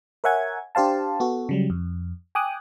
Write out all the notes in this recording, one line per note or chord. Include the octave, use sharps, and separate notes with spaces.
A#4 C#5 E5 F#5 G#5 G#6
D4 G4 C5 F5 A5
B3 F#4 A4
C#3 F#3 G3
F2
G5 G#5 D6 D#6 F#6